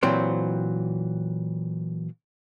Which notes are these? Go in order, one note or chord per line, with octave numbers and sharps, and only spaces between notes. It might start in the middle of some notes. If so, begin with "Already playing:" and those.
A#2 E3 F#3 C4 G4 C5